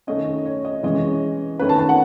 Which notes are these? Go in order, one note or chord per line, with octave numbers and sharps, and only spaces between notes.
D#3 A3 C#4 D#5
C#5
D#5
E3 G#3 C#4 D#5
D#3 A3 C#4 B4
A5
A5
F#5